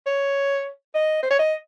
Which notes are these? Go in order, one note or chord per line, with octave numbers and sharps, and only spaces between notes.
C#5
D#5
C5
C#5
D#5